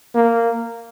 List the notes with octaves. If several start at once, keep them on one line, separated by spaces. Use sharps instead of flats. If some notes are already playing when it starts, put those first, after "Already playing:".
A#3